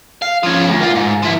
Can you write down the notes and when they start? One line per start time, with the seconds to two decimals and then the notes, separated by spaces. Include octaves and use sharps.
0.22 F5
0.43 F3 C#4
0.68 D2
0.80 A#3 F4
0.95 G#2
1.22 F3 E4